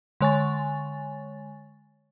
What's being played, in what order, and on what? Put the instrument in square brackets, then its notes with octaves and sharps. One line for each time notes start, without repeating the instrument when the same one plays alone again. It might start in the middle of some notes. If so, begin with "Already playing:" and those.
[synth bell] D3 G#3 C#5 G#5 C#6 A6